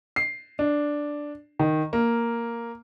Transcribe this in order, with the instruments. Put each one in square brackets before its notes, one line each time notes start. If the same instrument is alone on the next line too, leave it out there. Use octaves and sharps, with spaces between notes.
[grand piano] C7
D4
D#3
A#3